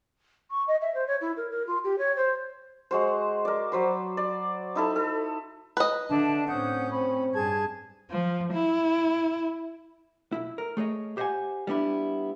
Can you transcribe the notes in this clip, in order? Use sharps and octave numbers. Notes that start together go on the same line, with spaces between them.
C#6
D#5
E5
C5
C#5
E4
A#4
A#4
F4
G4
C#5
C5
G#3 F#4 C5
A#4 D5
F#3 C5 B5
D5
D#4 E4 A4
A4
B4 D#5
D3 D4 E5 A5
A2 C4 C#4 F#5 D#6 G6
C4 B5
G2 G#4 A5 G#6
F3
E4
B1 E2 E4
A#4
A3 G#4 C#5 D#5
G4 C5 D#5 F5 F#5 G#5
G3 B3 D4 E4